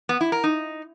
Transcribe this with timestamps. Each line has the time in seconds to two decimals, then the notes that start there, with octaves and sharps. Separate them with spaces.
0.09 B3
0.21 E4
0.32 A#4
0.44 D#4